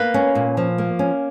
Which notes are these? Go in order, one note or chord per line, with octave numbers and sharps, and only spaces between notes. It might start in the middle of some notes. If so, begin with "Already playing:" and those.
Already playing: A#3 B4
C#4
A#2
F3
A#3
C#4